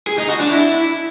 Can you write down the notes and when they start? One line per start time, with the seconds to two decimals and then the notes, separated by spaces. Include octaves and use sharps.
0.07 G#4
0.18 D#4
0.29 F#4
0.40 D4
0.50 E4